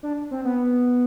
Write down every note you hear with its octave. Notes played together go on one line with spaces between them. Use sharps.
D4
C4
B3